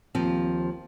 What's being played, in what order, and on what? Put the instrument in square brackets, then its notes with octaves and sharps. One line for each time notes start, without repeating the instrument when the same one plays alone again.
[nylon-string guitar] D#2 F3 C4